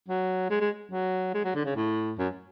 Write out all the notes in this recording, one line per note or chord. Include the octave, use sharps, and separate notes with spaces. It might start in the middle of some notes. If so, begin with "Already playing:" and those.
F#3
G#3
G#3
F#3
G#3
F#3
D3
C#3
A2
F#2